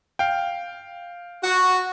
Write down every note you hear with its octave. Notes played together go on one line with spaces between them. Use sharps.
F5 G5
F#4